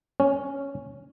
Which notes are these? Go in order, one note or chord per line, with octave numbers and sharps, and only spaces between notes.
C#4